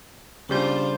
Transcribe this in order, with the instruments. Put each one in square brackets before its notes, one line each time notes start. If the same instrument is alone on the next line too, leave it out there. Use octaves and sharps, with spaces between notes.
[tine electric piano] C#3 G3 G6 [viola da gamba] D4 F4 C5